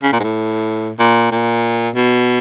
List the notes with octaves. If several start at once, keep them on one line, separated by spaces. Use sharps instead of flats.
C#3
A#2
G#2
A2
A#2
A#2
B2